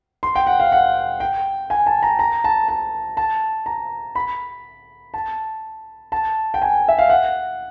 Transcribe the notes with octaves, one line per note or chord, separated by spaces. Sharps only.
C6
G5
F#5
F5
F#5
G5
G#5
A5
A#5
A#5
A5
A5
A5
A#5
B5
A5
A5
G5
G#5
E5
F5
F#5